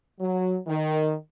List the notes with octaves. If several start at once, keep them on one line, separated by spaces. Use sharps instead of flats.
F#3
D#3